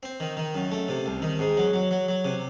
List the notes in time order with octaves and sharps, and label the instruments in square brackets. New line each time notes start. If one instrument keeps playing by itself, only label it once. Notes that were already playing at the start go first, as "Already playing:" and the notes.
[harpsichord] C4
D#3
D#3
F#2
A3
C3
C2
D#3
G#2
F#3
F#3
F#3
F#3
C3